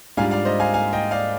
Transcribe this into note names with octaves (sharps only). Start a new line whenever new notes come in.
G#2 G3 D4 F4 F5 G#5
D5 F5
C5 D#5
F5 G#5
F5 G#5
D#5 G5
D5 F5